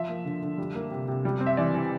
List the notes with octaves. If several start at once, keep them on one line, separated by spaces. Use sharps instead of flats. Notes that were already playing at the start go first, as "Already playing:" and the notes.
Already playing: F3 E5
A#3
D3
D3
G3
A#3
C3
C3
G3
C4
E5
E3 D5
E3